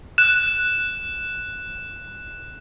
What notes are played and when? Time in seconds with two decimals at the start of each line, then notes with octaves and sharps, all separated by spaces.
0.18 F#6 E7